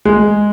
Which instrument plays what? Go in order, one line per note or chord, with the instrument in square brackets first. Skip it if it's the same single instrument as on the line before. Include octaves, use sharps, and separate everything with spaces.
[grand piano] G#3